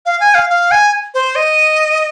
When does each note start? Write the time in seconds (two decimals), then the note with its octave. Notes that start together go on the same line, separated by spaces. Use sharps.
0.06 F5
0.20 G#5
0.34 F5
0.50 F5
0.71 G#5
1.14 C5
1.36 D#5